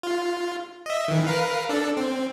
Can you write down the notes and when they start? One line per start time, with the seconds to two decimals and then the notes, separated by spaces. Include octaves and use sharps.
0.03 F4
0.86 D#5 E5
1.08 D#3 E3
1.27 A#4 B4 F5
1.69 D4 A4
1.97 C4